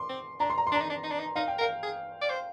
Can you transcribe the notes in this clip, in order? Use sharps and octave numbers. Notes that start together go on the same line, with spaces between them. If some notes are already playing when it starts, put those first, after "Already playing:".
Already playing: C6 D6
C4
D4 A#5
C6
A#5
C6
D4 A#5
D#4
D4
D#4
D4
D#4
D#4 F5
G5
A#4
F5
G#4
D5
C5